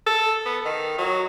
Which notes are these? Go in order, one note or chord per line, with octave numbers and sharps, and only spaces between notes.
A4
B3
D#3
F#3